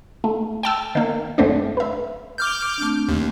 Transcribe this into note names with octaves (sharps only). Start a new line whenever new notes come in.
A3
G5 A5 E6
D#3 A#3
G#1 F#2 A3 C4 D4
B4 E5
D6 F6 G6
A3 C4 D4
D#2